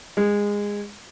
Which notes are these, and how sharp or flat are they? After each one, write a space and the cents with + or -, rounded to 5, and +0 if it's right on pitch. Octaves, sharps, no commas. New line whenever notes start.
G#3 -15